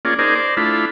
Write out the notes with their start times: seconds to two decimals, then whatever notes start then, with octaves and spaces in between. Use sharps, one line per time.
0.05 A#3 C#4 F4 G#4 D5
0.19 D#4 G#4 A#4 C5 D5
0.35 C5 D5
0.57 A3 D4 E4 F4 B5